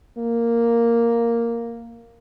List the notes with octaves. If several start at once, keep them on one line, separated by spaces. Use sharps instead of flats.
A#3